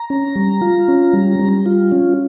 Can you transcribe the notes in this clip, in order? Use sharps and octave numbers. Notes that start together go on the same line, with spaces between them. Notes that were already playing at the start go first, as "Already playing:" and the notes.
Already playing: A#5
C#4
G3
F4
C#4
G3
G3
F4
C#4